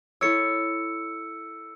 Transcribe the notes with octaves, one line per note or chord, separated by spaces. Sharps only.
E4 A4 C#5 E6 C#7